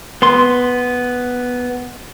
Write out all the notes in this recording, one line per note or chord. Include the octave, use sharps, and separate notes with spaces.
B3 C6